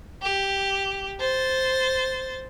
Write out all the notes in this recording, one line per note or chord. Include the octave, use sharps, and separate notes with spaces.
G4
C5 A6